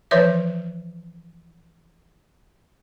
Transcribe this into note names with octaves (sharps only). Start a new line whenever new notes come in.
E3 F3 B4 C#5 E5